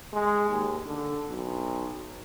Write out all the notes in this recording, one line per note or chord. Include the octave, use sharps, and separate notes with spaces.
G#3
D#2
D3
B1